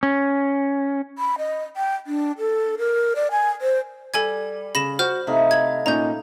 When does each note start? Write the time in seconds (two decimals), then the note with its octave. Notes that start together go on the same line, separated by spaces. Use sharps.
0.03 C#4
1.18 B5
1.38 D#5
1.77 G5
2.07 D4
2.39 A4
2.78 A#4
3.16 D5
3.31 G#5
3.61 C5
4.14 G3 A4 G#5 G#6
4.75 C#3 B5 A#6 E7
4.99 F#4 C5 F6 G6
5.27 C3 A3 D#4 E4 F5
5.51 G#6
5.86 A#2 C#4 D#4 A#5 G6